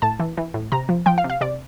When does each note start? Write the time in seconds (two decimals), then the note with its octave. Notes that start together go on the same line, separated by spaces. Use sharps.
0.02 A2 A5
0.20 E3
0.37 E3
0.54 A2
0.72 C3 A#5
0.89 F3
1.06 F3 G5
1.18 F5
1.24 C3
1.30 F5
1.41 C3 D5